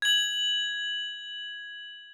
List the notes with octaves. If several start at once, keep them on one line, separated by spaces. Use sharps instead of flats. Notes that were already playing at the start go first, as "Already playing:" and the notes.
G#6 F#7